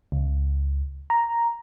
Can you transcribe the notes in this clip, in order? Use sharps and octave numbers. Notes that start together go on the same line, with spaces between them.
C#2
A#5